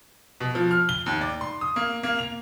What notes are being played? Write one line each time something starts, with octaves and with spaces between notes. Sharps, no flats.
B2
F3
F6
G7
D#2
D5
C6
D#6
A#3
A#3
F7